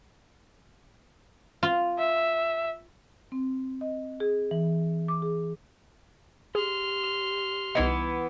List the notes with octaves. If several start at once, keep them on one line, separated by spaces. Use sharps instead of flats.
F4
E5
C4
D#5
G#4
E3
D6
G#4
G4 G#4 C6 F6
C2 E3 B3 D#4 D#5